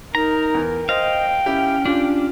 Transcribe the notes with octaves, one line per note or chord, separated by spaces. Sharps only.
D#4 A#4 A#5
E2
C5 D#5 F5 G5 A#6
C#4 E4 G4
D4 F4 G4